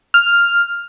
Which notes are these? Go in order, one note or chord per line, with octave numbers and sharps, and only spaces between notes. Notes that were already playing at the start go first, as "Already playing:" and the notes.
F6